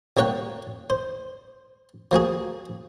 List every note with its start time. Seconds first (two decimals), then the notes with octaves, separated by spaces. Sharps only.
0.17 C2 A#3 C#5 F#5 G5
0.90 C5
2.11 F3 A#3 F#4 G#4